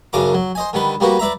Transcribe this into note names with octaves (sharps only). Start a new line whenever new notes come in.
B1 F#2 C#3 D4 A#4 D6
F#3
C5 D#5 G#5
D3 D#3 G3 B4
G3 A#3 B3 F#4 G4
B4 D5 E5 A#5